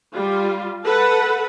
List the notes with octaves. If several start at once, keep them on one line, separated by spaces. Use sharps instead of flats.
G3 F4
A4 B4 F#5